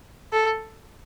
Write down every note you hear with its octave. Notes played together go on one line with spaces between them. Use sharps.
A4